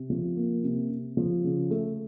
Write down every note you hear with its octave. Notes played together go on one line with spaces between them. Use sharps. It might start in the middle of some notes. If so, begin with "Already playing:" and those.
Already playing: C3
F3
A#3
C3
C3
F3
C#3
A3